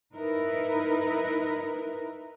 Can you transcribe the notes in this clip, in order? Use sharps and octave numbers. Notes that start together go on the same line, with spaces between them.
D#4 E4 A#4 B4